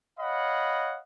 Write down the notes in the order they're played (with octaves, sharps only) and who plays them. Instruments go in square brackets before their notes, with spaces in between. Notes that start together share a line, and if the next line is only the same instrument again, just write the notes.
[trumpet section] C#5 D#5 F5 F#5 B5